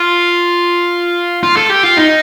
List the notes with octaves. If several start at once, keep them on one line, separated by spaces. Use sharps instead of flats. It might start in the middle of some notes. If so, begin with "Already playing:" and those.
Already playing: F4
F4
A4
G4
F4
D#4